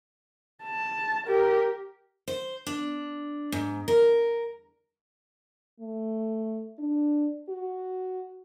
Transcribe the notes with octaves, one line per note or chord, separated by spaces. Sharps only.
A5
G4 A#4
C5
D4
G#2
A#4
A3
D4
F#4